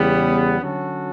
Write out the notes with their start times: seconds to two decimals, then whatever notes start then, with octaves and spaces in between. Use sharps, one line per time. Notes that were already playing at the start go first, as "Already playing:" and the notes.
Already playing: E2 C#3 G3 B3
0.60 D3 F#3 C#4 F#4 A4